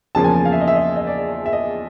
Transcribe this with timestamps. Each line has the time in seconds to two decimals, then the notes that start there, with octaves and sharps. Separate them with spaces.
0.15 E2 C#3 F3 A#3 A5
0.24 G#5
0.34 A5
0.45 F5
0.52 E5
0.61 D#5
0.68 E5
0.75 D#5
0.96 D#5
1.07 D5
1.46 E5
1.53 D#5